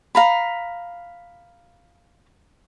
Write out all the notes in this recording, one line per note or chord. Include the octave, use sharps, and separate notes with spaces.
F5 A#5 B5